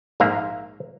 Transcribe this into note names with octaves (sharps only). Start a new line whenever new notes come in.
A#1 G#2 A#3 E5 F5